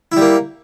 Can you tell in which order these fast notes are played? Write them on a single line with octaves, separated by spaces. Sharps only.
E4 G3 A#3